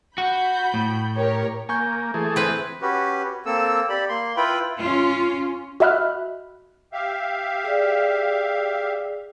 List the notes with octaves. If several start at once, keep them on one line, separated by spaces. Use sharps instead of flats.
F#4 B5 G6
A2
G4 A#4 C#5
A#3 G#5 C#6 G6
E3 A3 G#4
C4 B4
C#4 F#4 G4 B4
A#3 C4 A4 E6
G4 D5 B5
A#3 C6
E4 F4 B4 G5 B5
C#4 F4
F#4 D#5 E5 B5 F6 F#6
G4 E5 F5
G#4 D5